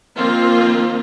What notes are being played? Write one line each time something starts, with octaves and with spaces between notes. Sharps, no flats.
D#3 F3 A#3 C4 F4